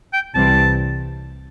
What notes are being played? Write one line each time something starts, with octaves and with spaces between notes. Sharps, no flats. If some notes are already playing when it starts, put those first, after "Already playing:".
G5
C2 C3 E3 G3 C4 A5